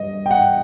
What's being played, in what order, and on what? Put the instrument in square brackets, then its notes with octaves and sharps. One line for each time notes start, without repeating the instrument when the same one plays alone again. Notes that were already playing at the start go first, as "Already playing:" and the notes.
Already playing: [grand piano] G2 D#5
G5
F#5